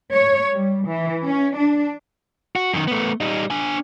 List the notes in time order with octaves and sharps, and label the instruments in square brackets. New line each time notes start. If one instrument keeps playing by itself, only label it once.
[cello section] C#5
G3
E3
C#4
D4
[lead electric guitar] F#4
F#2 D#3
A3 B3
G3 D#4
D4 G#5